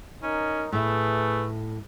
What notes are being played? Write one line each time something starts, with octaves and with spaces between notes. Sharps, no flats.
C#4 D#4 A#4
A2 A3 G#4 B4 E5